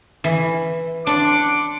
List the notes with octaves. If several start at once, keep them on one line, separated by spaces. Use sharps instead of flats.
E3
D4 F#5 C6 D6